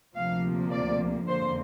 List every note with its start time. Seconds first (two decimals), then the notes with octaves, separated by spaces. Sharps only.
0.16 D2 C3 F3 A#3 F5
0.72 D5
1.27 F2 D3 A#3 C5